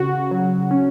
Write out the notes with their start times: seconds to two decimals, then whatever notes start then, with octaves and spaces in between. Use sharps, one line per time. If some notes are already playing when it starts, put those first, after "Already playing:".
Already playing: C#3 F#4
0.31 F#3
0.71 C#4